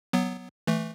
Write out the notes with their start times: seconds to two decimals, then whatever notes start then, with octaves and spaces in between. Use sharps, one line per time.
0.13 F#3 B3
0.67 E3 A3